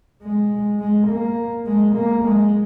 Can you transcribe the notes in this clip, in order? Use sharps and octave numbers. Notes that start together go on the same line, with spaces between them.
G#3
G#3
A#3
G#3
A#3
G#3